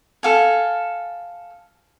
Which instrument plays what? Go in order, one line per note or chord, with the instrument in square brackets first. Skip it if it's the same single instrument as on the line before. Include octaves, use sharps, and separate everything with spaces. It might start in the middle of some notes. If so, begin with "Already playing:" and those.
[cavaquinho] A4 F5 G#5